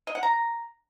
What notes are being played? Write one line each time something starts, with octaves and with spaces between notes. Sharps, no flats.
D#5
F#5
A#5